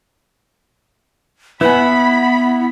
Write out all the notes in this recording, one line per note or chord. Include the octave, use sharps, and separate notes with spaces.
B3 E4 B4 F#5 G#5 B5